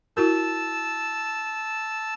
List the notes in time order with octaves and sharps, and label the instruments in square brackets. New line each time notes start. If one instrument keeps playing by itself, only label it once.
[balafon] E4 F#4 A#4 [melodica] A5 E6